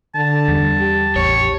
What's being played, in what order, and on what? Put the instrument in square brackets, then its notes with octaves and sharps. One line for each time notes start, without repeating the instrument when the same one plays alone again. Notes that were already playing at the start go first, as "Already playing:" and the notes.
[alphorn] D3 [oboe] A5
[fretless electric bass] E2 G3
[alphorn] G4
[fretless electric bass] A1 E2 [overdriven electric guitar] C#5